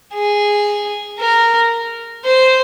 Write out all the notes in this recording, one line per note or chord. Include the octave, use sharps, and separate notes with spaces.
G#4
A#4
C5